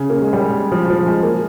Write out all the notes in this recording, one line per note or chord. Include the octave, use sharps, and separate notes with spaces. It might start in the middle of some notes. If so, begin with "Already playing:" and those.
Already playing: C#3
A#3
G#3
G3
F3
F3
G#3
A#3